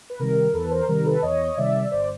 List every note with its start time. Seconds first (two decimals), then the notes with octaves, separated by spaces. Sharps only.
0.10 B4
0.19 C3 D#3 G3 A#4
0.53 E2 A4 B4
0.71 A#4 C5
0.88 C3 D#3 G3 A#4
1.05 A4 B4
1.22 E2 C#5 D#5
1.57 C3 D#3 G3 D5 E5
1.91 G1 C5 D5